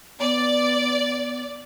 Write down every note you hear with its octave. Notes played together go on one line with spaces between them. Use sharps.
B3 D5